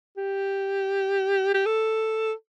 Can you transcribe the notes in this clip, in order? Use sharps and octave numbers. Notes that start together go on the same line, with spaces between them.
G4
G4
A4